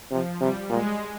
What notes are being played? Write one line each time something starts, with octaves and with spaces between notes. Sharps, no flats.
C3 F3
C3 G3
A#2 G#3